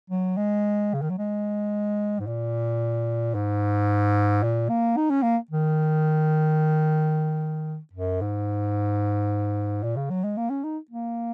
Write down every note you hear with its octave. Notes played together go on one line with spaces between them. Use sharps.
F#3
G#3
C#3
D#3
F#3
G#3
G#2
A#2
G#2
A#2
A#3
D#4
C#4
A#3
D#3
F#2
G#2
A#2
C#3
F#3
G#3
A#3
C#4
D#4
A#3